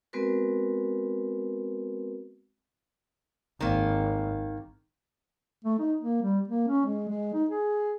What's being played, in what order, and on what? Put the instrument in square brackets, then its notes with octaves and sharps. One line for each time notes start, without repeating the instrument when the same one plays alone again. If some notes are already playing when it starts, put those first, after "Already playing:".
[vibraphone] G#3 B3 C4 F#4 A#4 B4
[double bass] G#1 [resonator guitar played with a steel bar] D#3 A#3
[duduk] A3
D#4
A#3
G3
A#3
C#4
G#3
G#3
D#4
G#4